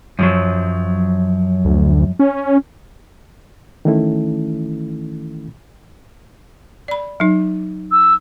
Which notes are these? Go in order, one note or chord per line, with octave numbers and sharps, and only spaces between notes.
F#2 F3 F#3
D2
C#4
D#3 E3 A3 C#4 E4 A4
D5 B5
F#3 D#4
E6